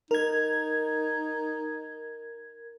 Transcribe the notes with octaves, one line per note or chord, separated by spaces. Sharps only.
D#4 A#4 G#6